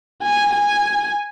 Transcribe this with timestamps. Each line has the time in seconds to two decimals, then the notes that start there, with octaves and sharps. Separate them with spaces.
0.22 G#5
0.53 G#5